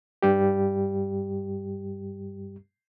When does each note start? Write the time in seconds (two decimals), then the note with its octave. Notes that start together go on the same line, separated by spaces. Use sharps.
0.22 G2 G3 G4